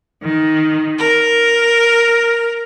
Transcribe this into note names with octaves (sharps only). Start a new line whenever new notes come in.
D#3
A#4